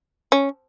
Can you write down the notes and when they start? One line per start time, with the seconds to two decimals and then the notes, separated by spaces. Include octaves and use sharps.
0.32 C#4